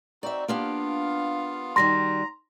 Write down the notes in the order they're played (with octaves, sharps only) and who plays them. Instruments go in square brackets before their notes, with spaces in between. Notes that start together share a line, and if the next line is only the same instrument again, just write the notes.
[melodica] C4 D#4 F#4 [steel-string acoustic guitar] D5 E5
[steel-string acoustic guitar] A#3 D4 G4 [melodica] B3 F4 F5
[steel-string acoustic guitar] D#3 G3 F#4 [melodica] A#5 [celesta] C6 A#6